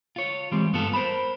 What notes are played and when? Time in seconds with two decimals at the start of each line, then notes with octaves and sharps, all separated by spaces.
0.16 F4 C#5
0.51 E3 G3 G#3 C4
0.73 G2 B3 F4 A4
0.93 A#4 C5 A5 B5